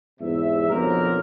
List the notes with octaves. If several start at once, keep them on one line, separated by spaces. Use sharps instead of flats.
E2 G#2 C3 E5
B1 F2 D3 A#3 C4 A#4